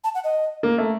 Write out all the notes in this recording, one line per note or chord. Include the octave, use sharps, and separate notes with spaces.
A5
F#5
D#5
A#3
A3